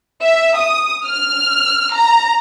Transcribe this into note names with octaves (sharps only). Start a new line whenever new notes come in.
E5
D#6
F6
A#5